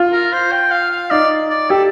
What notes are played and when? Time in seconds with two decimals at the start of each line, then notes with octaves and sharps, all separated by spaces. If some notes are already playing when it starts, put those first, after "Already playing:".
Already playing: F4
0.12 A#4
0.32 C5
0.52 G5
0.71 F5
0.91 F5
1.11 D#4 D5
1.50 D5
1.70 G4 A4